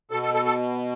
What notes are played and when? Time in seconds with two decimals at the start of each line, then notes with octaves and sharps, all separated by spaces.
0.11 B2 A4
0.23 A4
0.34 A4
0.45 A4